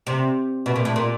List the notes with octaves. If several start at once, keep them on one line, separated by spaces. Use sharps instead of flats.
C3
B2
A#2
A2
A#2